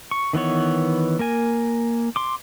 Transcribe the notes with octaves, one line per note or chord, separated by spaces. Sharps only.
C#6
D#3 E3 B3 C#5
A#3 A#4 G#5
C6 D6